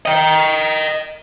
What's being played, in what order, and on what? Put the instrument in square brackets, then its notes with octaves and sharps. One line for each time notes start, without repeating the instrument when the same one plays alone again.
[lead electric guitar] D#5 G5